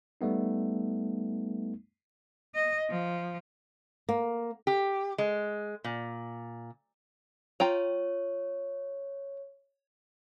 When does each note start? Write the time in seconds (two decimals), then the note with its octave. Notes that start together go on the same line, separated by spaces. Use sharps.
0.21 G3 A3 B3 D#4
2.55 D#5
2.90 F3
4.09 A#3
4.67 G4
5.18 G#3
5.84 A#2
7.60 F4 C#5 G5 A#5